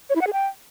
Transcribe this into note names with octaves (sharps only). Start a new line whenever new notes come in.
C#5
E4
F#5
G#4
G5